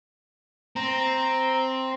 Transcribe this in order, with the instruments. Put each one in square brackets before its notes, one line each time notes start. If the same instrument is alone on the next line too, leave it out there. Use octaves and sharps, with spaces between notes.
[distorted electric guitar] C4 [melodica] A#5